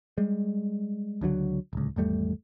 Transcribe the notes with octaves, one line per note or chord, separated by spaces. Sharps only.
G3 G#3
C#2 D3 F3 F#3
D1 C#2
G#1 E2 G3 A3